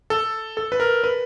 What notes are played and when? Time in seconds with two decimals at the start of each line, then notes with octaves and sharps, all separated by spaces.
0.10 A4
0.57 A4
0.72 B4
0.80 A#4
1.04 B4